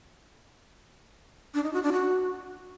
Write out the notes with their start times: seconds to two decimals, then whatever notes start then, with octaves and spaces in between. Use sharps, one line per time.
1.54 D4
1.64 D#4
1.73 F#4
1.83 D4
1.92 F#4